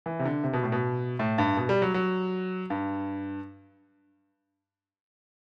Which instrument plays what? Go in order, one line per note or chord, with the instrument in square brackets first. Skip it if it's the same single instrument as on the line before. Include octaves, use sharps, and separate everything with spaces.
[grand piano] E3
C3
D3
C3
B2
A2
B2
A2
G2
B2
G3
F#3
F#3
G2